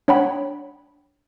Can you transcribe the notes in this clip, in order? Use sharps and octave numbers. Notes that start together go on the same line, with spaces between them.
D4 C#5 F#5 G5 B5